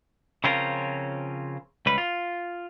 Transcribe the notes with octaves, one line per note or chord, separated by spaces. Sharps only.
C#3 F3 C4 C#4 F4 A#4
C#2 G3 B4
F4